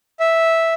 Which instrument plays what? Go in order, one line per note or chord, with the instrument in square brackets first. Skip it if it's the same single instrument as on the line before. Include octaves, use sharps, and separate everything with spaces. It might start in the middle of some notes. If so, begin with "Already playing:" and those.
[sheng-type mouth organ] E5